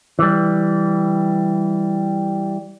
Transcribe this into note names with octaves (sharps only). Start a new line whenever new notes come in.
E3 G3